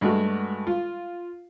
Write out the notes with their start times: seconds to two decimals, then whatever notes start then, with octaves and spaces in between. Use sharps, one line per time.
0.01 G2 G#3 A3 F#4
0.67 F4